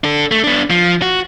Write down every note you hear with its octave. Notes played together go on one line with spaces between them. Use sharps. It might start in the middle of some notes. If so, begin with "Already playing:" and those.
D4 A4
A3
B3 D4
F3
F#4